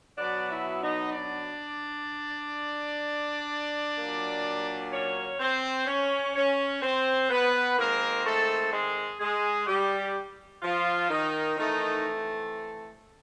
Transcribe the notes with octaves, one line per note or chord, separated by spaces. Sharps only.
B2 F#3 B3 D4 D5
E4 E5
D#4 D#5
D4 D5
A#2 F#3 A#3
C#4 C#5
C4 C5
C#4 C#5
C#4 C#5
C4 C5
B3 B4
D#3 G#3 A#3 C4 A#4
A3 A4
G#3 G#4
G#3 G#4
G3 G4
F3 F4
D#3 D#4
D#3 E3 A3 C4 D#4